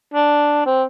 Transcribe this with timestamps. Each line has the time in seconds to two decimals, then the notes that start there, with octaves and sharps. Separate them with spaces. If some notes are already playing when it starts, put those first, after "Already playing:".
0.14 D4
0.66 C4